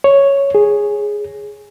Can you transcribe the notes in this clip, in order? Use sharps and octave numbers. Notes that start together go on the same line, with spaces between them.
C#5
G#4